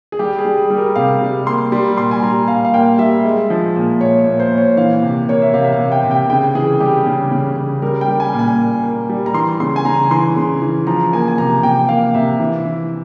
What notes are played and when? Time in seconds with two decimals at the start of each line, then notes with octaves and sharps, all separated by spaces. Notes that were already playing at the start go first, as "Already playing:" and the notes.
0.12 G#4
0.19 G3 G4
0.39 G#4
0.45 G3
0.58 G#4
0.70 G3
0.77 A#4
0.96 C3 F5
1.21 G3
1.46 A#3 C6
1.72 G3
1.97 A#2 C6
2.11 G#5
2.23 G3 A#5
2.48 A#2 F5
2.65 F5
2.74 A#3 G5
2.99 G3 E5
3.25 G#3
3.50 F3
3.76 A#2
4.01 A#2 C#5
4.26 A#2
4.40 C5
4.52 A#2
4.58 C#5
4.77 E3 F5
5.02 C3
5.29 A#3 C#5
5.42 E5
5.53 C3 F5
5.64 E5
5.72 F5
5.79 C3
5.92 G5
6.04 C3
6.11 G5
6.30 C#3 G5
6.55 E3 G#4
6.80 G3 G4
7.06 C#3
7.32 C#3
7.56 C#3
7.82 G3 A#4
8.01 G5
8.08 G3
8.20 G#5
8.33 A#2
8.39 G#5
8.59 A#2
8.83 A#3
9.10 G3
9.26 A#5
9.34 E3 C6
9.60 C#3 C6
9.76 G#5
9.85 C#3 A#5
10.11 E3 C6
10.36 C#3
10.62 E3
10.87 F3 A#5
11.13 A#3 G#5
11.28 G#5
11.38 C3 A#5
11.63 C3 G5
11.79 G5
11.89 A#3 F5
12.14 C3 E5
12.40 E3
12.65 E3